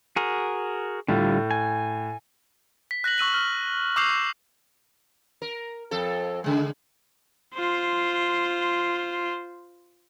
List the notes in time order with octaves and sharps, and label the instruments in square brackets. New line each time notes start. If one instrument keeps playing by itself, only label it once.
[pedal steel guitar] F#4 G#4 A#4
[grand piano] A2 [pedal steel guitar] D3 G3 F4
[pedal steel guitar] G#5
[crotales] B6
F#6 A#6 B6 F#7
C#6 E6 D#7 F#7
F6
C#6 D6 E6 G6 C7 F7
[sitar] A#4
F2 A4
C#3 G#3
[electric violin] F4 C5